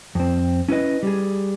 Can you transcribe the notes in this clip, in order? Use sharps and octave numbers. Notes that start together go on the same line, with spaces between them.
F2 C4
C#4 E4 G#4 B4 D#5
G3 G#4